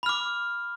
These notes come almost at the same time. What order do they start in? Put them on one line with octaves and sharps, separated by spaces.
B5 F6 D6